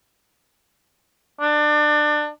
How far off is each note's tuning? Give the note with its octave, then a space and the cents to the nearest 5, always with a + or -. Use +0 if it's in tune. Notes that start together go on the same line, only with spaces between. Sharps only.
D4 +25